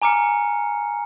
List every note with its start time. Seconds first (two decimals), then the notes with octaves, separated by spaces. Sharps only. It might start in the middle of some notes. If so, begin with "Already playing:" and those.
0.02 G#5 A#5 D6 F6 C#7